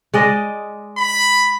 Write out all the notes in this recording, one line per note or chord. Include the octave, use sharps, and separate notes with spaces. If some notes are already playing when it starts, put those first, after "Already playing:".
G#3 D5 D#5
B5